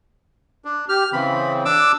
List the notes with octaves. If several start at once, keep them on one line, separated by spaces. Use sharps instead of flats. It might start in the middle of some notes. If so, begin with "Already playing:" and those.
D4
G4 F6
C#3 E3 C4 B5
D4 D6 E6